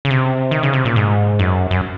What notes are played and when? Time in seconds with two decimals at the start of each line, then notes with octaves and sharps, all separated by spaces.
0.05 C#3
0.10 C3
0.51 D#3
0.63 C#3
0.73 C3
0.85 A#2
0.96 G#2
1.39 F#2
1.71 F#2